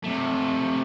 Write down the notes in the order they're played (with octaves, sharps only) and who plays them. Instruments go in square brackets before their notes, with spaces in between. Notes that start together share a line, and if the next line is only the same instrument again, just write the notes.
[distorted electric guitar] C3 A3